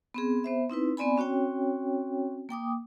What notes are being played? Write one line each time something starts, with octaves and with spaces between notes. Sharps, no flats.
B3 C4 G#4
B3 C5 E5
C4 D#4 E4 B4
B3 C4 D5 G#5 B5
C4 C#4 F#4 C#5 G5
A#3 G5 D6 D#6